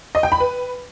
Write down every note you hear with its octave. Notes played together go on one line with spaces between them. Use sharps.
D#5
G5
B5
B4